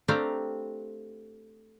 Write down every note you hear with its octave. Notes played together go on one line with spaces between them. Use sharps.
A3 C4 D4 G4 F5 A#5